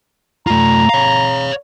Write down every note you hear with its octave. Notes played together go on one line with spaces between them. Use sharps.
A3 F4 A#5
C#5 F5